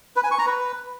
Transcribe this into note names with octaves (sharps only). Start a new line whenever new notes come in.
B4
G#5
C#6
A#5
B4